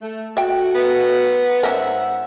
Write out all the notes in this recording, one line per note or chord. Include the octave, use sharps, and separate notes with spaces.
A3
A3 F#4 E5 G5
B3
G#2 C4 C#4 A#4 E5 F#5